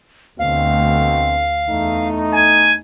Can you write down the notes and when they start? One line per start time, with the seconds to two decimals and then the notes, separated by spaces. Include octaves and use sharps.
0.39 D2 B2 A3 C4 F5
1.68 E2 A3 D#4
2.34 G#5